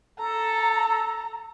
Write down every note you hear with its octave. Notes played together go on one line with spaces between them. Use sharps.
A4 A#5